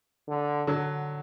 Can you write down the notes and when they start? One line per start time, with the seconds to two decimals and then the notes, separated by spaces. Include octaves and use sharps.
0.28 D3
0.67 D3 F#3